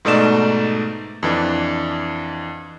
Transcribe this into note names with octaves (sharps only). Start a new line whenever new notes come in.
G#2 B2 A3 D#4 D5 E7
F2 E3 D4